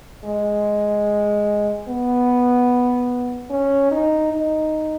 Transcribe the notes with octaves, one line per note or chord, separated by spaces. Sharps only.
G#3
B3
C#4
D#4
D#4